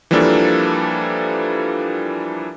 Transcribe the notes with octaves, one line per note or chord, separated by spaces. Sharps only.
E3 F3 G3 A#3 D4 A4